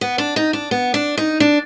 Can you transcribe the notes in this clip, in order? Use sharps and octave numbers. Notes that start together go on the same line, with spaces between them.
B3
D4
D#4
D4
B3
D4
D#4
D4